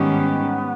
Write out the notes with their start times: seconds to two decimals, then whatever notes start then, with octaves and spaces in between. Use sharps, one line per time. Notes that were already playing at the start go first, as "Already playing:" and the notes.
Already playing: G#2 D#3 G3 B3 C#4 G4